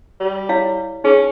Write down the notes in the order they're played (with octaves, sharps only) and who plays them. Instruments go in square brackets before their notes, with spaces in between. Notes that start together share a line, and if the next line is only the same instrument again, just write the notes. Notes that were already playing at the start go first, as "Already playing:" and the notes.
[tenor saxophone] G3
[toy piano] E4 C#5 F5
[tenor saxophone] C#4 [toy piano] D#4 G#4